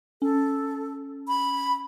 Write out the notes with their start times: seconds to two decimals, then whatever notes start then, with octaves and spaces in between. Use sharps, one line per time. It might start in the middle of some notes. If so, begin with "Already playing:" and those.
0.22 C#4 A4
1.28 B5